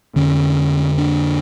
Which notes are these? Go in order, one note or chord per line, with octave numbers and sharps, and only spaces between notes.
F2 D3 C#4
D4